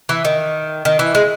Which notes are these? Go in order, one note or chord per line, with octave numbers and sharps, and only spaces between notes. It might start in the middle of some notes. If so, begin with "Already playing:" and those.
E3
D#3
D#3
E3
G#3